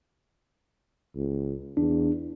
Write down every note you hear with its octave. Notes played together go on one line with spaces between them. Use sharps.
C#2
E2 D4